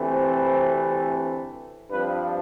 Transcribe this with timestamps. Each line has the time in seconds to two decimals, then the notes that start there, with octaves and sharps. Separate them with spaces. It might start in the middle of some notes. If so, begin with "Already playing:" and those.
Already playing: D2 C3 E3 A3 C4
0.08 C5
1.90 G2 F3 C4 B4